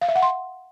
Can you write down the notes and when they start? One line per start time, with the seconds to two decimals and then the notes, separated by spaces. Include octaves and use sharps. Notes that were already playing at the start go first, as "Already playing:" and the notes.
0.01 F5
0.08 E5
0.15 F#5
0.22 C6